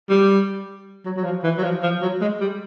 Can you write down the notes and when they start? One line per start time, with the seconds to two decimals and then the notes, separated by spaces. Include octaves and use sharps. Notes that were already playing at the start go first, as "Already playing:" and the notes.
0.09 G3
1.05 F#3
1.16 F#3
1.24 F3
1.44 E3
1.58 F#3
1.64 F3
1.83 F3
2.01 F#3
2.21 G#3
2.40 G3